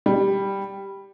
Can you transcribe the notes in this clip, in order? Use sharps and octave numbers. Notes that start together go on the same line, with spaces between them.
G3